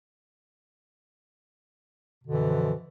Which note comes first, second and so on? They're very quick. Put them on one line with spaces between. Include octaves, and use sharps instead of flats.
B2 F#2 D3 E3 F3